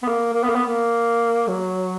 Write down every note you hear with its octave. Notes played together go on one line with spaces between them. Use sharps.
B3
A#3
A#3
B3
A#3
B3
A#3
F#3